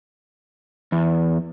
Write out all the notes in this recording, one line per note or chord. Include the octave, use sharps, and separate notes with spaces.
E2